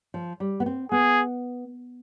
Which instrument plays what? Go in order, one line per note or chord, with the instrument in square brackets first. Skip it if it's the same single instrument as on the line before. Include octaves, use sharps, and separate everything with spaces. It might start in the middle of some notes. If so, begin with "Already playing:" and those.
[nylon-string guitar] F3
G3
B3
C4
[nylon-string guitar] B3 [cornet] G#4